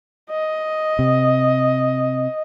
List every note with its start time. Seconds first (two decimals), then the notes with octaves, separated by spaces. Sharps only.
0.30 D#5
0.99 C3